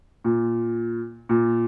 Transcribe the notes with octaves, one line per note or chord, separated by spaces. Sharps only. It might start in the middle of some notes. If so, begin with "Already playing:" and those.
A#2
A#2